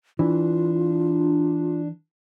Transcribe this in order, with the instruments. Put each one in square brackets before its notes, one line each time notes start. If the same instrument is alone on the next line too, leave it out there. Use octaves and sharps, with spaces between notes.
[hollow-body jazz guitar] E3 [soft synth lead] D4 [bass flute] F4